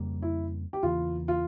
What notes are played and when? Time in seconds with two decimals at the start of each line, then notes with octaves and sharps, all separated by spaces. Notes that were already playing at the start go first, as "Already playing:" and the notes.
Already playing: F2 C#3 G3 A#3
0.22 E4
0.73 G4
0.83 E2 C#3 E3 A#3 F4
1.28 F4